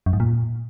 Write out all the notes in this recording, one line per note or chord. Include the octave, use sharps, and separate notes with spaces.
F#2
G#2
A#2